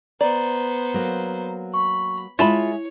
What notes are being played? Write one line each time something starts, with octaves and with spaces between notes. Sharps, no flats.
B3 C5 D5 A#5
F#3 A#3
B5 C#6
G#3 E4 F4 C#5 E5 A5 B5